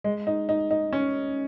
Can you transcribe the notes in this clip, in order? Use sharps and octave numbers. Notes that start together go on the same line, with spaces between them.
G#3
D#4
D#4
D#4
C#4